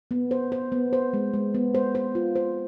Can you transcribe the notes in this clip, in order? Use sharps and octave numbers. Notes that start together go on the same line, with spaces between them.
B3
C5
C5
B3
C5
G#3
G#3
B3
C5
C5
F4
C5